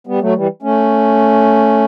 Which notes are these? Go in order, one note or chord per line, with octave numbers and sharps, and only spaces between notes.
G3 B3
F#3 A3
E3 G3
A3 C#4